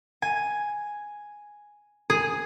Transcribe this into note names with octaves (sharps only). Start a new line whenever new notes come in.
G#5
G#4